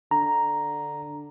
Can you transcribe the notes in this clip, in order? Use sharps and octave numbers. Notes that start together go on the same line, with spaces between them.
D3 A#5